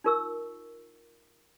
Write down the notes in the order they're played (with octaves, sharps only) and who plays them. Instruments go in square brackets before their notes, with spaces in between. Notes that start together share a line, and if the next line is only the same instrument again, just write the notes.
[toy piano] D#4 F4 A#4 C#6 E6